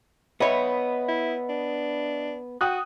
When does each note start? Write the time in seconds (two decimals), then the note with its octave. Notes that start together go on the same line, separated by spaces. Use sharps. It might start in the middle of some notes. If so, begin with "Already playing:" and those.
0.40 B3 C#5 D#5 E5 B5
1.08 E4
1.49 D4
2.61 F#4 G5 D#6 F#6